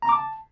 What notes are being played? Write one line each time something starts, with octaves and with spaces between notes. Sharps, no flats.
A#5
D6
A5